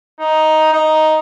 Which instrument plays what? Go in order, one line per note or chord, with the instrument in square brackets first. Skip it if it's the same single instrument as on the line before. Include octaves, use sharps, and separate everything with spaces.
[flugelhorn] D#4
D#4